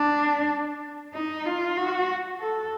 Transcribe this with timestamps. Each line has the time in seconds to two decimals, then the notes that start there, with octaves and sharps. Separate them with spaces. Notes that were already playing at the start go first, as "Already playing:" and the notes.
Already playing: D4
1.14 D#4
1.46 F4
1.77 F#4
2.40 A4